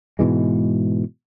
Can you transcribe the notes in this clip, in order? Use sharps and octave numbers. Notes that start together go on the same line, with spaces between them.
G#2 B2 E3 G#3